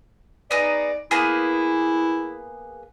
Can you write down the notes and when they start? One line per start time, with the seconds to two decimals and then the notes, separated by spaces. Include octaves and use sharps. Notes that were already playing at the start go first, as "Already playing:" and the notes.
0.51 B3 D#4 G#4 D5
1.11 A#3 B3 E4 G#4